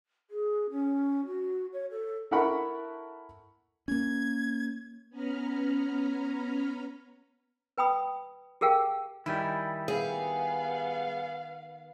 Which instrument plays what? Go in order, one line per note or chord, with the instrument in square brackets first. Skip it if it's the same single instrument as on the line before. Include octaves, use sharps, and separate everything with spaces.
[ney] G#4
C#4
F#4
C#5
A4
[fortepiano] E4 A4 A#4 F#5 B5 C#6
[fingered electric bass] A#3 C#4 [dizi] G#6
[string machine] B3 C#4 A#5 B5 F6
[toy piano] B4 G5 B5 D#6
G4 G#4 A#4 F5 G5
[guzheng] D#3 G#5 [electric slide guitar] G3 E4
[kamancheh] B3 F5 [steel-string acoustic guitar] G#4